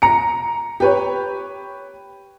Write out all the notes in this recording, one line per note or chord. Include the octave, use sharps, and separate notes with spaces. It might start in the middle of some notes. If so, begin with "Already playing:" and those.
A#5 C#7
G4 B4 C#5